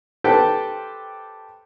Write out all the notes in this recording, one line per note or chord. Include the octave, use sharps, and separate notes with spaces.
G4 A4 B4 C5 G5 A5